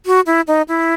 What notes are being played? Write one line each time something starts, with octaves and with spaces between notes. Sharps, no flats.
F#4
E4
D#4
E4